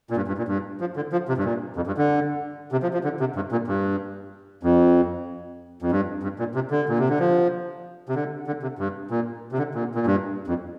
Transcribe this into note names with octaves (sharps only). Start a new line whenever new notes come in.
A#2
G2
G2
A#2
G2
F3
D3
F3
C3
G2
A#2
F2
G2
D3
C3
F3
F3
D3
C3
G2
A#2
G2
F2
F2
G2
G2
A#2
C3
D3
A#2
C3
D3
F3
C3
D3
D3
C3
G2
A#2
C3
D3
A#2
A#2
G2
F2